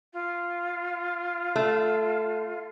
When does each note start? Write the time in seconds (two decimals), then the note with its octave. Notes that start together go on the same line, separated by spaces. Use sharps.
0.13 F4
1.56 A3